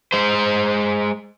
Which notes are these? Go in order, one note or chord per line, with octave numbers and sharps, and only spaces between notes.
G#3 C5